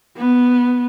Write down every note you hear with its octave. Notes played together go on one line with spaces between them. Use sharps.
B3